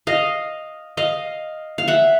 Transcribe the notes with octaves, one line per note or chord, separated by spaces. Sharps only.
D#5 F5
D#5 F5
F5
E5 F#5